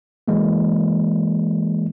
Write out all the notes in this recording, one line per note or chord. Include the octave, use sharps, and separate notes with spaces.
E3 G#3 A#3